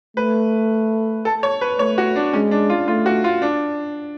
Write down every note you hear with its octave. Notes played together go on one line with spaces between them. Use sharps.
A3 B4
A4
C#5
B4
A3 C#5
F#4
D4
G#3 C#4
D4
F4
A3 F4
F#4
F4
D4